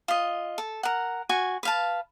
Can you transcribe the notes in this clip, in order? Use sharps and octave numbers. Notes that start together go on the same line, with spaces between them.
F4 D#5
A4
A#4 F#5
F#4 G#5 C#6
B4 F5 A5